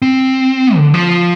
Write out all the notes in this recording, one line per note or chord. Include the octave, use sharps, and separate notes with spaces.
C4
D3
F3